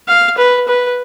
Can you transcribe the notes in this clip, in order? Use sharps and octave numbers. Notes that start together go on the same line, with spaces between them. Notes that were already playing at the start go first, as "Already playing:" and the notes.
F5
B4
B4